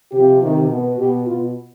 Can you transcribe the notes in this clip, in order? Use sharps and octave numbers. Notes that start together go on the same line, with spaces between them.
C3 F3 G4
C3 D#3
B2
B2 G4
B2 F4